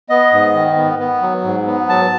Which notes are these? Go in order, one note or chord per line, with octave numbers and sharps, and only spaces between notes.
B3 D#5
G#2
D#3
B3
B3
F#3
G#2
B3
F#3 A5